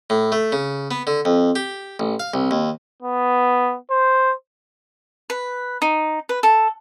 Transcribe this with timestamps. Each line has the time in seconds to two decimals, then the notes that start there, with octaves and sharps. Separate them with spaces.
0.10 A2
0.32 A3
0.52 C#3
0.91 B3
1.07 D3
1.25 F2
1.56 G4
2.00 A1
2.20 F5
2.34 C2
2.51 D#2
3.03 B3
3.90 C5
5.30 B4
5.82 D#4
6.29 B4
6.43 A4